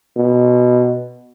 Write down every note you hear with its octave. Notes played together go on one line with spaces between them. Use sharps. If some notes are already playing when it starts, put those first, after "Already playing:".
B2